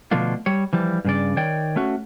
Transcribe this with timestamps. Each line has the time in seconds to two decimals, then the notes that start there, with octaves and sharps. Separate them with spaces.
0.11 B2 D3 F3 A3 D4 F4
0.46 G3 C#5
0.73 E3 F3 G3
1.05 G2 C#3 D5
1.37 D#3 C#5 D5 G5
1.76 A3 C#4 F#4